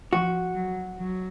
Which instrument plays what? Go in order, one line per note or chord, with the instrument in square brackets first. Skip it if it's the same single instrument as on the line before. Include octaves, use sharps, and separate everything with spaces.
[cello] F3 [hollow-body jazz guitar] F#4
[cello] F#3
F#3